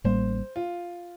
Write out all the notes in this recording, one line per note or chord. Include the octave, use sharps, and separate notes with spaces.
A1 A2 G3 A#3 C5
F4